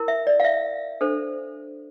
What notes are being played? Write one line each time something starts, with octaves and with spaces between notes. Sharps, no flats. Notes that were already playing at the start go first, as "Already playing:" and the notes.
Already playing: E4 A#4
E5
D5
F5
E5
D4 A4 C5